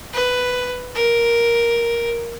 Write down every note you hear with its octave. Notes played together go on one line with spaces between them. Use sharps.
B4
A#4